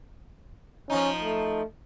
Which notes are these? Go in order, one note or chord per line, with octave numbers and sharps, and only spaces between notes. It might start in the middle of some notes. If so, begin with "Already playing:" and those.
F3 C#4 D#4
A3